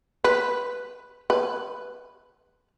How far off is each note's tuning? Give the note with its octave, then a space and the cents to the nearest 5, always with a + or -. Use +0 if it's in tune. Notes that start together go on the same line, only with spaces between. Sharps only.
B4 -5
B4 -5